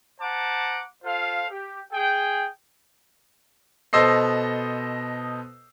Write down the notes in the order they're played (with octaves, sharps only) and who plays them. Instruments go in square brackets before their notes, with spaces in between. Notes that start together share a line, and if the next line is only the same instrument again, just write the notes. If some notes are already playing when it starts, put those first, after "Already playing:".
[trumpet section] C5 F#5 A5 A#5 D6
F4 A4 C5 F5
G4
G#4 G5
[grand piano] B2 A4 C5 D#5 E6 C7